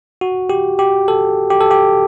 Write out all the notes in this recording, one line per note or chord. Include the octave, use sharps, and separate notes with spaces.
F#4
G4
G4
A4
G4
A4
G4